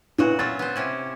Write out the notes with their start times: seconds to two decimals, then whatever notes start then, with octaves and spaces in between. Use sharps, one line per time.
0.18 A#2 C#3 E4 F#4 B4
0.39 F#3 F4 E5 A6
0.59 B3 C5
0.76 C3 C#4 E4